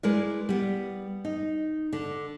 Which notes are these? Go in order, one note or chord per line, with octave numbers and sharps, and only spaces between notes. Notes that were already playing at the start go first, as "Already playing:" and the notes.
G#3 E4 A#4 B4 D5
G3 B3
D#4
D3